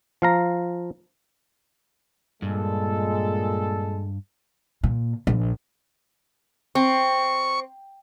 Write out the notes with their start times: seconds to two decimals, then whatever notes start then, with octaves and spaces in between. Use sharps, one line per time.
0.22 F3 F5 A#5
2.42 G2 A#2 G#3 A4
4.84 A#2
5.27 A#1
6.75 C4 C#6